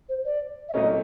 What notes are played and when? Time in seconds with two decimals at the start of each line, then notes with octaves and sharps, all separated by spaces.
0.09 C5
0.25 D5
0.69 E5
0.73 C2 A#2 F#3 A3 C#4 D#5